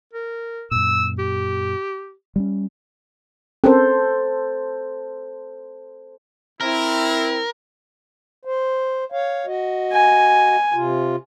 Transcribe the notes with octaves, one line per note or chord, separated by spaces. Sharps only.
A#4
F#2 A#2 E6
G4
G3 G#3 C#4
C4 C#4 A4 A#4 C5
C4 E4 A#4
C5
C#5 F5
F#4 D#5
G#5
C3 F4